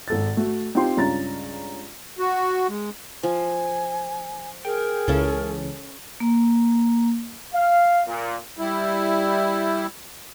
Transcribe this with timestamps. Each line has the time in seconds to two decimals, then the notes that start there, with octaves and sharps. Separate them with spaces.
0.08 G#1 A4 A6
0.37 A3 F#4
0.75 C4 D#4 F4 G4 G5 C6
0.96 C#2 G2 C#4 F4 A#5 A6
2.19 F#4
2.69 G#3
3.23 F3 G#5
4.65 G#4 A#4 G5
5.08 C#2 C#3 E3 C#4 A4
6.20 A#3 A#5
7.54 F5
8.07 A#2
8.58 G3 E4